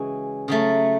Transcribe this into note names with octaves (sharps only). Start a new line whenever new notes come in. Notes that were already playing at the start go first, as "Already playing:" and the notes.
Already playing: C#3 E3 G#3 C#4 F#4
C#3 F#3 A3